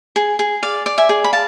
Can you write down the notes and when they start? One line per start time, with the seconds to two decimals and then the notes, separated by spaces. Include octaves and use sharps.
0.16 G#4
0.39 G#4
0.63 D5 F5
0.86 D5
0.98 E5 G#5
1.09 G#4
1.24 B5
1.33 F5 A5